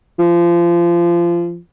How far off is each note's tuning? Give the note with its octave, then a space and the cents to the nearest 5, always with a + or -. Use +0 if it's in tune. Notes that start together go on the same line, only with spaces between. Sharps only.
F3 -25